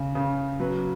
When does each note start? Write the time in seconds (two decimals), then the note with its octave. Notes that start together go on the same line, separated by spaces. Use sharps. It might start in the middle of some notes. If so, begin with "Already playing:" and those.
Already playing: C#3
0.15 C#3
0.60 F#3 B4